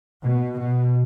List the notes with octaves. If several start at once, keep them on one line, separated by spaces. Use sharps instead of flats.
B2
B2